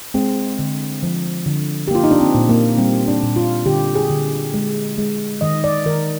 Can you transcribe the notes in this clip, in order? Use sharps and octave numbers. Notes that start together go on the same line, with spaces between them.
G#3 C4
D3
F3
D3
G4
A#3 F4
D#4
D4
C4
A#2
A#3
G3 C4
D4
A#2
F4
D3 G4
G#4
D3
G#3
G#3
D#3 D#5
D5
D#3 A#4